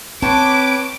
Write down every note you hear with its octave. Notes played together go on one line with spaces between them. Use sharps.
C4 B4 C#5 G5 A5 D6